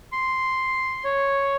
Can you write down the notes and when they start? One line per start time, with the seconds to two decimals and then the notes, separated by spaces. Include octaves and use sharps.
0.12 C6
1.04 C#5